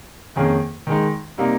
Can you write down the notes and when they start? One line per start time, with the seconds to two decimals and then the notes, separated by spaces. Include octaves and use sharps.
0.36 F2 D#3 A#3 C#4 G#4
0.87 D#3 G#3 D#4
1.38 C3 G3 A#3 D#4